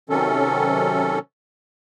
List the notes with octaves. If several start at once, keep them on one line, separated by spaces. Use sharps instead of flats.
C3 D#3 F#3 C#4 A4